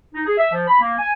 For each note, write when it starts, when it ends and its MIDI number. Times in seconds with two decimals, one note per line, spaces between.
0.14 0.25 63
0.26 0.37 68
0.38 0.51 76
0.52 0.65 53
0.68 0.78 83
0.81 0.93 58
0.99 1.12 80